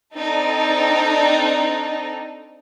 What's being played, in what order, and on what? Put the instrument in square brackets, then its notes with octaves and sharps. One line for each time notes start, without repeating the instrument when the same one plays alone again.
[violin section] C4 D4 D#4 A4